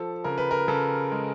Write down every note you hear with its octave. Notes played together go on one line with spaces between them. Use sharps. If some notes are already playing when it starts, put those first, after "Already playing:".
Already playing: F3 A4
C#3 A#4
B4
A#4
C#3 A4
G#3